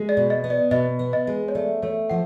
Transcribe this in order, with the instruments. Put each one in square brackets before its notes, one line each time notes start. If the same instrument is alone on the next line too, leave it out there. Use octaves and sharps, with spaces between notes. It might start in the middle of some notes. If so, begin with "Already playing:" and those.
Already playing: [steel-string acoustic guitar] G#3
[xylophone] D5
[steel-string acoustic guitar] B2
[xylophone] D#5
[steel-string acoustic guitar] B3
[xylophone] D5
[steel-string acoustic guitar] B2 [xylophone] D#5
[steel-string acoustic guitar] B3
[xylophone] D#5
[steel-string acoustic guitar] G#3
[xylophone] C#5
[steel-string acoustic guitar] A3 [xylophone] D5
[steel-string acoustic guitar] A3 [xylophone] C#5
[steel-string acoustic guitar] F3 [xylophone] F#5